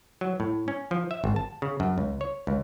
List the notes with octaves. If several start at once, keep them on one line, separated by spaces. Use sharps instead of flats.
F#3
A2
C#4
F3
E5
G#1
A5
C#3
F#2
C#2
C#5
C#2